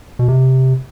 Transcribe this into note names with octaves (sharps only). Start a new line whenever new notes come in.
B2
C3